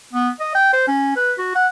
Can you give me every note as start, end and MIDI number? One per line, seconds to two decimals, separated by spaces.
0.13 0.29 59
0.40 0.52 75
0.55 0.72 79
0.73 0.87 72
0.88 1.12 61
1.16 1.33 71
1.38 1.54 66
1.55 1.67 78